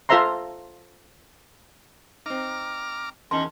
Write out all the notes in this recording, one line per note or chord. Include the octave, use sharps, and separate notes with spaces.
F4 A4 C5 E5 A#5 C6
C4 D#4 A#5 D6 F6
E2 D#3 C#4 A#4 A5 C6